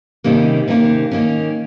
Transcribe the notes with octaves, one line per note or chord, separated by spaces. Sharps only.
C3 D#3 G3 A#3 C#4
C3 D#3 G3 A#3 C#4
D#3 A#3 C#4